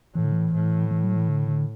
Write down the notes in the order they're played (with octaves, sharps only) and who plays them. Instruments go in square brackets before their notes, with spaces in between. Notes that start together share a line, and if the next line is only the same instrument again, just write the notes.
[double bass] A2 [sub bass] E3
[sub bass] D3
E3
[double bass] A2
[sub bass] E3
F#3
E3
D3
D3